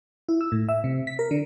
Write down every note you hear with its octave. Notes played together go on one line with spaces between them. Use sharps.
E4
E6
A2
E5
C3
B6
A#4
D3